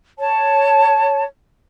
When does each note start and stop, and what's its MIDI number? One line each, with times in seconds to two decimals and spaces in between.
0.19 1.25 73
0.19 1.25 81